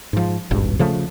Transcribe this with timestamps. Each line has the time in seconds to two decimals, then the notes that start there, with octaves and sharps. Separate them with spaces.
0.13 G#2 F3
0.51 D#1 G#1 G2
0.79 C#3 F3 A3